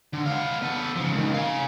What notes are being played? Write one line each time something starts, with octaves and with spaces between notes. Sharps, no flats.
D3
B3 F5
B3 A4
C#3 F3
C#2 D#3
F5 G#5